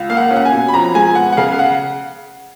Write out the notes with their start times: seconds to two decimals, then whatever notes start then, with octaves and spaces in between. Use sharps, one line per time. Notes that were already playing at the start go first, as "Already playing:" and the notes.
Already playing: C#2
0.09 A#3 F5
0.17 F#5
0.31 C#4
0.36 F#5
0.45 G#5
0.52 B2
0.68 B5
0.74 F2 A#5
0.95 G#3 G#5
1.15 B3 F#5
1.32 F#5
1.37 C#3 F5
1.52 F5
1.59 F#5